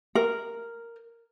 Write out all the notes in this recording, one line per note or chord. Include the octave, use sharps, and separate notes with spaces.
A#4